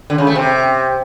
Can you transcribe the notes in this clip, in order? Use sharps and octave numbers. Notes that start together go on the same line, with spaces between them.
D3
C#3
A3
C3